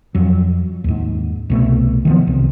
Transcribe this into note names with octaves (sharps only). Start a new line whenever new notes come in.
F2 F#3
D#2 G#2
C2 B2 A3
D#3 F3 B3
C2